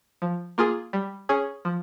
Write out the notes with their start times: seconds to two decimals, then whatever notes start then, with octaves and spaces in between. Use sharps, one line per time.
0.22 F3
0.58 A#3 F4 G#4
0.93 G3
1.29 C#4 G#4
1.65 F3